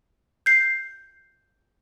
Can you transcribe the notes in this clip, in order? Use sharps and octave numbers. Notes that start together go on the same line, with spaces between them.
G6 C7